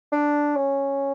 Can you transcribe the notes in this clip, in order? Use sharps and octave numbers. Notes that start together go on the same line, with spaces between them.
D4
C#4